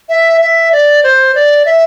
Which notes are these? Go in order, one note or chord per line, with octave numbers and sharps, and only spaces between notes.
E5
E5
D5
C5
D5
E5